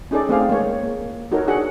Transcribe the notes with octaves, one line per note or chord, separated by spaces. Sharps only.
C#4 D#4 G#4 A4 D5
A3 C4 G#4 C5 D5 F5
G#3 A#3 C#5
A#3
D#4 F#4 A4 A#4 C#5
D4 F#4 G#4 F#5